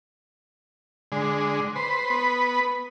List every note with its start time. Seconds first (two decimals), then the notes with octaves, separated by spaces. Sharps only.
1.12 D3 G#3
1.76 B4 C5
2.10 B3 B4